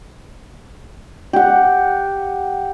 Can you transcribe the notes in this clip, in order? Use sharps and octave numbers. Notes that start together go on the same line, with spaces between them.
G4 F#5